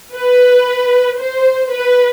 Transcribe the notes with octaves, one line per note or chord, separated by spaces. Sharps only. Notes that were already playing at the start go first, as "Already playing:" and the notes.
B4
C5
B4